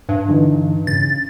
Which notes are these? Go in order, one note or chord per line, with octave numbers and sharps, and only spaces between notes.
G2
D3 E3 D#4
C#3 A6